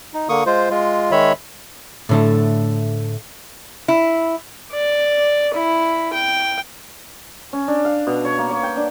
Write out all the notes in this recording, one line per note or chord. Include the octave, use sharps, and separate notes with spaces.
D#4
D3 A#3 C#6 D#6
G#3 F4 C5
G#3 F4
D#3 G#3 C#5 E5 B5
A2 D3 A3
E4
D5
E4
G5
C#4
D4
F5
B2
C#5
A#3
C#5
G5
D4